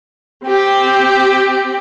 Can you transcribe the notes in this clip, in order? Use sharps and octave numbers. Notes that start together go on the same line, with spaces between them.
C4 G4 G5